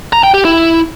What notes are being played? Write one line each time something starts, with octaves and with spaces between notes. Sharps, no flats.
A#5
G5
G4
E4